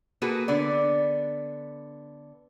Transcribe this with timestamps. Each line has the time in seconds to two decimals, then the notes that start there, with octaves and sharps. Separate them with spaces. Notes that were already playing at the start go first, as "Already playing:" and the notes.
0.22 A#3 F#4 G#4 A4 B4
0.48 D3 B3 D5